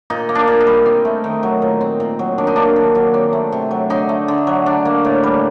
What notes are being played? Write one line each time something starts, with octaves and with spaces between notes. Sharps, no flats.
A#2 D#4
A#3
D4
A#2
D#4
G3
C4
A3
D#3
F#3
A#2
C4
A#2
F#3
D#3 D4
D#4
A#3 D4
D#3
F#3
C4
A3
C3
F#3
D3 D#4
A3
D3
F#3
D4
A#3
A2
G3